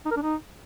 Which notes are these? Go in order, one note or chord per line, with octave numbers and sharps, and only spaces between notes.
D#4
A#4
D4
D#4